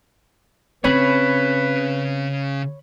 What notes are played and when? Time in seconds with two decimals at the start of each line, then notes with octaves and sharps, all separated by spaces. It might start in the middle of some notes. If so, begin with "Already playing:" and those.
0.84 C#3 C4 C#4 B4 C#5 B5